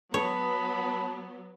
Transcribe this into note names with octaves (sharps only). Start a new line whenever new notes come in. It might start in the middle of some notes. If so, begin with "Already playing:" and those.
F#3 B3 C#5 A5 B5